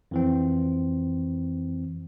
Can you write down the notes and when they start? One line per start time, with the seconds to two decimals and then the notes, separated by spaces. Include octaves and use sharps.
0.11 F2 E3 C4